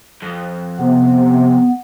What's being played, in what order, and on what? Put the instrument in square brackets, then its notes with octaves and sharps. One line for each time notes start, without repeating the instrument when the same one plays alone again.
[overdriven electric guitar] F2
[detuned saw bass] C3 [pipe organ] B3